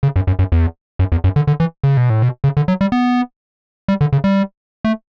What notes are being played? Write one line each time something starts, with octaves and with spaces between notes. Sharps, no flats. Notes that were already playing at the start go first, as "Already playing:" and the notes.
C#3
F#2
F#2
F#2
E2
F#2
E2
F#2
D3
D3
E3
C#3
B2
A2
B2
C#3
D3
F#3
G3
B3
G3
D3
C#3
G3
A3